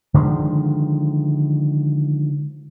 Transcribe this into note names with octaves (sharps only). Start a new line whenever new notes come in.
D3 D#3 F3 G#3